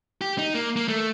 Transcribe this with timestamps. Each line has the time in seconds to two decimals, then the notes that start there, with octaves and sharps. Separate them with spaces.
0.21 G4
0.38 D#4
0.55 A#3
0.76 A#3
0.88 A3